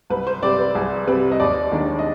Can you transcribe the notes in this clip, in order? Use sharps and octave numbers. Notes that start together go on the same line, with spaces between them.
C2 B4
C5
C3 G3 C4 D5
B4
C2 G#4
C3 G3 C4 B4
D#5
D#2 D5
D#3 G#3 D4
D#5